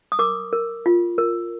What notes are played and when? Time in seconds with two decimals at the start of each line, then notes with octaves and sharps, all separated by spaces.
0.12 D#6
0.19 A#4 D6
0.53 A#4
0.86 F4
1.18 A#4